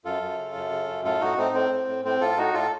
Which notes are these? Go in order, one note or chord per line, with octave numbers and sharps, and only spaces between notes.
F#2 F4 A4
F#2
C#3
F#2
C#3
F#2
A2 F4 A4
A2 D#4 F#4
A2 C4 D#4
A2 C4
A2
A2
A2 C4
A2 F4 A4
A2 D#4 F#4
A2 F4 A4